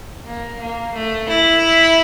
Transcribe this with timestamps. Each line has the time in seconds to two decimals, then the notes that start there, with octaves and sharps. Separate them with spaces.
0.26 A#3
0.60 A#3
0.94 A3
1.29 E4